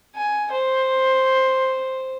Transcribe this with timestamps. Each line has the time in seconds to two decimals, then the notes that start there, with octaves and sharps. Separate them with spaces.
0.16 G#5
0.52 C5